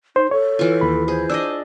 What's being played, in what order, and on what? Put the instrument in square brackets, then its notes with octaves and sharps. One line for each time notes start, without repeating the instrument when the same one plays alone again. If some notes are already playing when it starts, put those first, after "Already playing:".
[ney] D#4 [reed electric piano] C5
[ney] A4 [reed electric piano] C#5
[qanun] E3 F4
[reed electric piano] D#2 B5
[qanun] G#4 [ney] C5
[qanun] D4 D5 D#5 [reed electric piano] E6